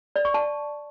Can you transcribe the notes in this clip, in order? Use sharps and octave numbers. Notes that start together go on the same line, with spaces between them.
D5
C#6
A5